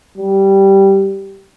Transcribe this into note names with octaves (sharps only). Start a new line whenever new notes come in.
G3